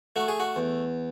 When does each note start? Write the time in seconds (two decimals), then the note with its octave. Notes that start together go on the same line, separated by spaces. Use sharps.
0.16 A3 F#4
0.28 G#4
0.40 F#4
0.56 E2